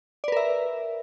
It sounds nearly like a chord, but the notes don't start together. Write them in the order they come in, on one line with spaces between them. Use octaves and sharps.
D5 B4 A#4 E5